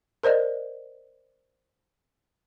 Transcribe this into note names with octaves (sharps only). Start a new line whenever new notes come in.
A#4 C5 D5 D#5